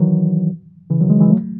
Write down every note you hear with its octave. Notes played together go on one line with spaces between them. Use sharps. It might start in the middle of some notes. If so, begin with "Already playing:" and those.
Already playing: D#3 E3 F#3
C#3 E3
D#3 F#3
E3 G#3
E3 G#3
F#3 A3